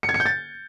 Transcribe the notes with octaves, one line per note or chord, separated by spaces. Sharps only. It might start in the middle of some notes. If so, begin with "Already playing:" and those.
C#7
G#6
C#7
G6
A6